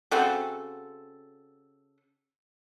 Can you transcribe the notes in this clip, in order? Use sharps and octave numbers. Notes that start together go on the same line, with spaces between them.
C#3 C4 F#4 A4